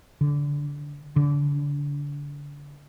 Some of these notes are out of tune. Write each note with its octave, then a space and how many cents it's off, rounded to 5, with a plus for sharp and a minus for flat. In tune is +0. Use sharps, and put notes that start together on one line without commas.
D3 -20
D3 -30